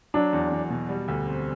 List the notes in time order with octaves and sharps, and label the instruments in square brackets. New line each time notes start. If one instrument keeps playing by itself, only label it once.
[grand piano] F#3 [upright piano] D4
[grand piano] E2
E2
B2
G3
D2
C4